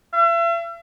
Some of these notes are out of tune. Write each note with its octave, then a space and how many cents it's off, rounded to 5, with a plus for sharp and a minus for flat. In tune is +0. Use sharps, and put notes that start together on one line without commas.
E5 +40